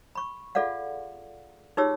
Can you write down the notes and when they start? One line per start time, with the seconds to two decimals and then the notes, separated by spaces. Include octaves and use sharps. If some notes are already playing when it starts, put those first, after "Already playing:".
0.15 B5 C#6
0.55 F4 G#4 A4 D5 F5 F#5
1.77 D#4 F4 G4 G#4 C#5 E6